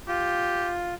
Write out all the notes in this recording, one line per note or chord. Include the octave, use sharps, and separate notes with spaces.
F4 G4